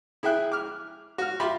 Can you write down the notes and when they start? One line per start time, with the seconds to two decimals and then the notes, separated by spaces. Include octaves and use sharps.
0.23 E4 G#4 E5 G5 F#6
0.52 D6 F6
1.18 F#4 F6
1.40 F4 G4 E5 B5 C6